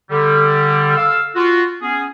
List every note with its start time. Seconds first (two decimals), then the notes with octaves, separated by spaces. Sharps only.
0.10 D3 G3
0.96 A4 F5 E6
1.35 F4 F#4
1.82 B3 C#4 G#4